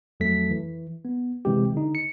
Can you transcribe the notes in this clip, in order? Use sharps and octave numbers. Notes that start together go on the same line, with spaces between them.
F2 F#3 A3 A4 B6
E3
B3
C3 E3 G#3 C4 G4
D3 D#4
C#7